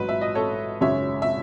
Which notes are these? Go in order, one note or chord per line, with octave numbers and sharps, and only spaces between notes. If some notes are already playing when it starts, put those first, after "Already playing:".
Already playing: A1 G#2 F#3 B4
E5
D#5
A4 C#5
G#1 F#2 C#3 G#3 C#4 C#5 E5
E5